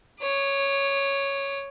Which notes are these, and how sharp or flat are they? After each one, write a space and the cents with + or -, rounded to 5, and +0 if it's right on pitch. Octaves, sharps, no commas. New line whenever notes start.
C#5 +0 D6 +40